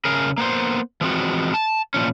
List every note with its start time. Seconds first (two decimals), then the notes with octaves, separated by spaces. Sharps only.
0.05 C#3 G#4 A#4
0.38 A#3 B3 C5
1.01 E3 F3 G#3 C4 F#4
1.54 A5
1.94 A#2 F3 C#4